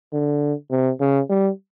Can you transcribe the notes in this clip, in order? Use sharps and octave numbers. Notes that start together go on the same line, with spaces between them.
D3
C3
C#3
G3